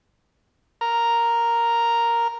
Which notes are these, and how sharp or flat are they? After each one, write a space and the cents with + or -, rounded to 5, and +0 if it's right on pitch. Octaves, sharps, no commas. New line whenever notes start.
A#4 +0 A#5 +0